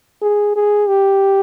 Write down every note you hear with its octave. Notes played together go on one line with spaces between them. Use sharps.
G#4
G#4
G4